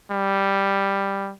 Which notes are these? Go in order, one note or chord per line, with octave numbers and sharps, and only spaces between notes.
G3